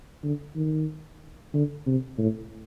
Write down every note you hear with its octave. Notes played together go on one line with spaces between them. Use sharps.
D3
D#3
D3
C3
A2